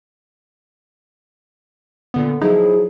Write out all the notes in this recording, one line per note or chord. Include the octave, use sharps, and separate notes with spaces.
A#2 D3 B3
F3 F#3 D#4 E4 G#4